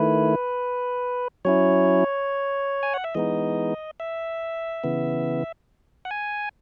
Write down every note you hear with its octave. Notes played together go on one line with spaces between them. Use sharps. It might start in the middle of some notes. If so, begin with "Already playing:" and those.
Already playing: D#3 A3 E4 B4
F#3 C#4 E4 C#5
G#5
F#5
E5
E3 G#3 B3 D#4 D#5
E5
C#3 E3 B3
F#5
G#5